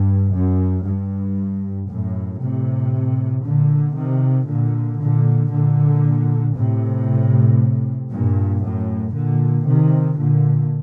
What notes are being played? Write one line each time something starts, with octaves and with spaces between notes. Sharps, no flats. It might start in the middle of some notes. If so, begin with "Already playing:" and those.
Already playing: G2
F#2
G2
F#2 A2
A2 C3
A#2 D3
C3 D#3
A#2 D3
A#2 D3
A#2 D3
A2 C3
G2 A#2
F#2 A2
A#2 D3
C3 D#3
A#2 D3